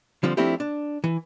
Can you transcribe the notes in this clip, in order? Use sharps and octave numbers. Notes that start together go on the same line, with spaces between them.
D3 F3 G3 C4
F3 A3 C4 D4 E4 G4
D4
E3